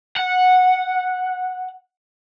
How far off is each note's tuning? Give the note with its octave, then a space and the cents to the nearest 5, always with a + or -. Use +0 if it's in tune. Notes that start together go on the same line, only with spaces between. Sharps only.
F#5 -10